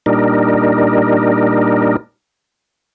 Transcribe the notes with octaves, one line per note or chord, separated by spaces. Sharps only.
A#2 G3 D4 D#4 A#4